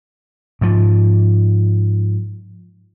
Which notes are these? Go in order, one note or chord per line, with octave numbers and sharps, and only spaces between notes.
G#2 F3